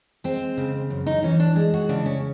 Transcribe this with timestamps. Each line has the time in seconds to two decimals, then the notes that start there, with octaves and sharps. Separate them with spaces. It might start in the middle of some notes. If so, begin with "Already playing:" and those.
0.24 G#3 C4
0.57 C#3
0.90 F#2
1.06 D#4
1.23 E3 C#4
1.40 D4
1.56 G#3
1.74 F#4
1.89 C#3 D4
2.06 C#4